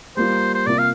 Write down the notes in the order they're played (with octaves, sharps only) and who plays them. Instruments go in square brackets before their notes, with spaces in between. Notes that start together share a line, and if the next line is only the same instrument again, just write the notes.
[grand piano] G3 A#3 F4 [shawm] C5
[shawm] C5
[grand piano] C3 A#3 F4 [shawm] D5
[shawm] F5